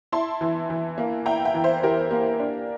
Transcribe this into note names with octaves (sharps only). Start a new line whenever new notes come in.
E4 A5 C6
E3
E3
A#3
E4 G5 A#5
E5 G5
E3
C5 E5
E3 G4 A#4
A#3
D4